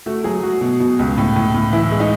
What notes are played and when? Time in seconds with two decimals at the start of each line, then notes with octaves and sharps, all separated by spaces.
0.06 A3 F#4
0.24 F#3 G#4
0.43 F#3 F#4
0.61 B2
0.80 B2
0.99 C#2
1.17 A2
1.36 A2
1.54 A2
1.73 E3 E4
1.91 G#3
2.00 D#4